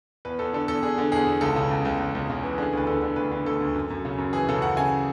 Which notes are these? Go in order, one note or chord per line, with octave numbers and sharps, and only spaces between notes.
E2 B4
E2 A4
D3 A4
E2 A4
D3 G#4
D3
E2 G#4
E2
C#2 A4
C#3
C#2
C#2
C#2
C#2
C#3
E3
D3 G#4
D2 B4
D3 A4
D3
D2 B4
D3
D2 A4
D2
F#2
F#2
C#3
F#2
E3 G#4
C#3 A4
F#2 F#5
C#3 G#5